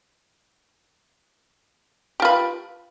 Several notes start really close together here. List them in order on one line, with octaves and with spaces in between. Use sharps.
G4 F4 B4